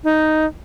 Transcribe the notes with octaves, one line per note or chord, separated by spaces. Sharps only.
D#4